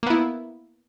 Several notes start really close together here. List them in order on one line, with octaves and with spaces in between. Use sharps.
A#3 B3 E4